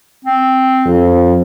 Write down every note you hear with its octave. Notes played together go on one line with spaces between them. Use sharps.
C4
F2